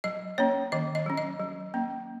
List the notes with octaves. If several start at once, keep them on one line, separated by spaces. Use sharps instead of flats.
F#3 D#5
A#3 C#4 C#5
D#3 D#5
D#5
F#3 C#4
D#5
F#3
A#3 C#4